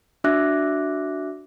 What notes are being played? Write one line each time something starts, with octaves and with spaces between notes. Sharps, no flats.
D4 F#4 E5 D6 F#6 A#6